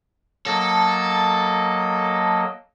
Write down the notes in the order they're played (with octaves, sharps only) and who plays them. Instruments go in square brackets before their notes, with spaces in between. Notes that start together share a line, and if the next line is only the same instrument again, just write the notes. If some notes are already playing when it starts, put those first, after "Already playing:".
[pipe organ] F#3 A#3 D#5 [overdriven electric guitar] A4